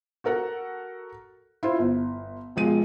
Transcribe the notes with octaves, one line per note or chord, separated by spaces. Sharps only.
F#4 A4 A#4 F#5
E4 F4 C5
G1
E1 F3 G#3 D#7